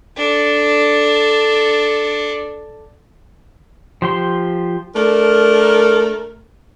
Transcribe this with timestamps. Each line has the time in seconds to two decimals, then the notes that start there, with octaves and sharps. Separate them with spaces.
0.17 D4 A4
4.02 F3 G4 C6
4.95 A3 D4 A#4